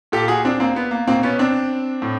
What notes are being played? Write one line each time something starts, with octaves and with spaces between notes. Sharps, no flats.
A#2 G4 A4
F#4 G#4
C4 D4
A#3 C4
B3
A#3
B2 A#3 C4
B3 C#4
C4 D4
A2